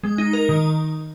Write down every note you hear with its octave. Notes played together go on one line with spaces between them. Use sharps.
G#3
D#4
A#4
D#3